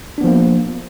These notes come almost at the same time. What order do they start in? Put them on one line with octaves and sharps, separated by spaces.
D4 B3 F3 A#3